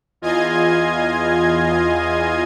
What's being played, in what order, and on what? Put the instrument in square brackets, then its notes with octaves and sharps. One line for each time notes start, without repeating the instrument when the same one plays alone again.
[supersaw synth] E2 F4 D#5 G#5 G#6